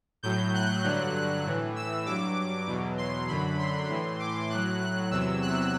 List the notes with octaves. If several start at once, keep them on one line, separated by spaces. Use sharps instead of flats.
A2 F#3 G6
F#6
G2 D3 F#3
F#6
A2 E3
E6
G2 F#3 D6
E2 B2 F#3
C6
F#2 D3 F#3 B5
C6
A2 E3
D6
A2 F#3 F#6
F#6
E2 C3 F#3 E6
F#6